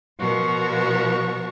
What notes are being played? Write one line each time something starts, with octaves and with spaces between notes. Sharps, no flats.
B2 F3 F#4 A#4 C#6